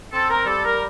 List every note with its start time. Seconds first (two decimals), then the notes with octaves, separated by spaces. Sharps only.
0.13 C4 A4
0.30 A#4
0.46 G3 A4
0.64 A#4